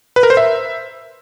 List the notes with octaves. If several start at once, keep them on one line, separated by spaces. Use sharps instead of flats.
B4
A#4
C5
E5